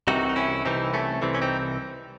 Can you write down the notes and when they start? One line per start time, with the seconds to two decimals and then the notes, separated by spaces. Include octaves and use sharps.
0.07 C2 C3 E3 D#4 F#4
0.29 D#4
0.36 C#4 E4
0.65 C2 C3 E3 C4 D#4
0.94 A3 C#4
1.22 C2 C3 E3 C4
1.35 C#4
1.42 C4 D#4